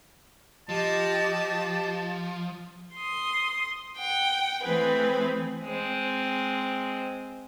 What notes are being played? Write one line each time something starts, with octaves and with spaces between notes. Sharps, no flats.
F3 G4 D#5 A5
C6 D#6
F#5 G5
E3 A3 C4 G#4 B4
G#3 C4